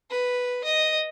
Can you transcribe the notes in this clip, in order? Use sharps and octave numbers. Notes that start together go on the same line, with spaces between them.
B4
D#5